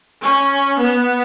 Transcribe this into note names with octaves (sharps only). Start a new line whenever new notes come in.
C#4
B3